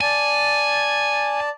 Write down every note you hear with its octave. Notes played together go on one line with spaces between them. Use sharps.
D5 G#5 A5